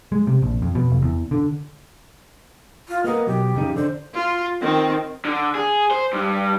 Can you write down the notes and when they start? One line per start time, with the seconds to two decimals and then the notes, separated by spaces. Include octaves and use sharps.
0.12 G#3
0.27 C3
0.42 A#1
0.62 F2
0.75 B2
0.91 F1
1.02 E2
1.31 D3
2.89 F4
3.04 A#3 B3 A#4 D#5
3.27 B2 F#3 G4
3.55 F2 C#3 D#4
3.76 D3 C5
4.14 F4
4.61 D#3 C4
5.25 D3
5.55 G#4
5.91 C5
6.13 G2